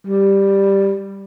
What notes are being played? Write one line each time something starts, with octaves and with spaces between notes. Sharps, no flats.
G3